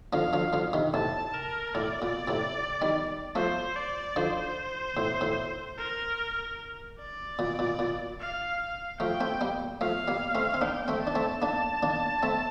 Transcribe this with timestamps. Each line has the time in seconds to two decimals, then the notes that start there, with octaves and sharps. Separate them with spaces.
0.13 D3 F3 F5
0.33 D3 F3
0.53 D3 F3
0.73 C3 D#3
0.94 A2 C3 A5
1.34 A#4
1.75 A2 D5
2.02 A#2
2.28 A2 C3
2.82 D#3 G3
3.35 F3 A3 C5
3.76 D5
4.16 D3 F3 C5
4.97 A2
5.21 A2
5.78 A#4
6.99 D5
7.39 A#2
7.59 A#2
7.79 A#2
8.20 F5
8.60 F5
9.00 F3 A3 G5
9.21 A3 C4
9.41 G3 A#3
9.81 F3 A3 F5
10.08 G3 A#3
10.35 A3 C4
10.54 C4
10.61 A#3 D4 G5
10.88 A3 C4
11.02 D4 A5
11.15 A3 C4
11.42 A#3 D4 A5
11.83 A#3 D4
12.23 A3 C4